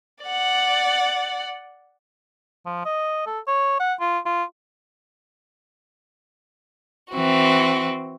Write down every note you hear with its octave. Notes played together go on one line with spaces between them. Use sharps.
D5 F#5
F3
D#5
A4
C#5
F#5
F4
F4
E3 C4 F#4